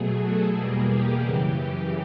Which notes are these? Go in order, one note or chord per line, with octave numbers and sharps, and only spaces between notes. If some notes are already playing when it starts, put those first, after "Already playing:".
Already playing: B2 F#3 A3 G#4
A4
E2 B2 G3 A#3 G#4
G4
F#2 C#3 E3